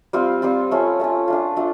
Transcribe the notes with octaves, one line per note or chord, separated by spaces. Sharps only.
G3 C4 F4
G3 C4 F4
A3 C#4 F4
A3 C#4 F4
A3 D4 F4
A3 D4 F4